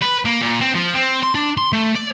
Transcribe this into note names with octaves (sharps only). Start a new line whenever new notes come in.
B4
A#3
A#2
C4
F3
C4
C6
D4
C6
A3
D5